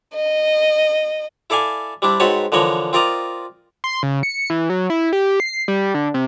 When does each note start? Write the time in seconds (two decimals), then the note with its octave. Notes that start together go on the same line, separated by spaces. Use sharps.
0.14 D#5
1.50 E4 A4 D5 F5 G#5
2.02 G3 C4 D4 E4
2.20 G#2 C4 F#4 B4 C#5 A5
2.52 D3 E3 F3 A#4 C#5
2.93 C4 F4 A#4 D5 D#5 A#5
3.84 C6
4.03 C#3
4.23 C#7
4.50 E3
4.70 F#3
4.90 E4
5.13 G4
5.40 C7
5.68 G3
5.94 D3
6.14 C3